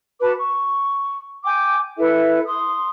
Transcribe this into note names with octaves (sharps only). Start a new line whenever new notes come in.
F#4 B4 A5 D6
C#6
G5 G#5 D6 G6
E4 A4 B4 E5
C6 D#6